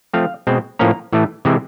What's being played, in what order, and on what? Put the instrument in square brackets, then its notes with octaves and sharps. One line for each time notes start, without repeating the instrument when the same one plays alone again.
[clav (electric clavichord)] F3 A3 C4 F5
B2 G#3 C4
A2 F3 A#3 C#4 A#5
A2 E3 A3
C3 E3 G#3 C4